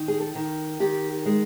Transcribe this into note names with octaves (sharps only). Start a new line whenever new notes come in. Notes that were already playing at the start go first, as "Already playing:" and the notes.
Already playing: D#3
G#4
A4
D#3
D#3 G4
G#3